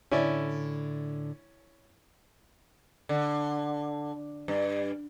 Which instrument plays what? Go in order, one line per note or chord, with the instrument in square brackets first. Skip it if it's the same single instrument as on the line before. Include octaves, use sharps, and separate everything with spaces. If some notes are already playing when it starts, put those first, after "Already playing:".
[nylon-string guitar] A2 D3 [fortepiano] C#4 E4 D5
[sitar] D3
G2